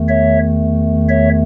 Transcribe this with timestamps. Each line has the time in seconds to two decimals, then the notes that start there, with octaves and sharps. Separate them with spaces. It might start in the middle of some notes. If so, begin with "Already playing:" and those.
Already playing: E2 D#3 A3
0.09 C#5 E5
1.09 C#5 E5